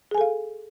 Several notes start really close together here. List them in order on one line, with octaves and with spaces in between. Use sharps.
G#4 G#5 A4 F5